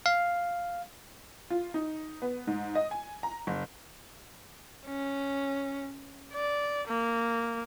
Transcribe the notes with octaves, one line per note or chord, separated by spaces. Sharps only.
F5
F4
D#4
B3
G#2
D#5
G#5
A#5
F#1
C#4
D5
A#3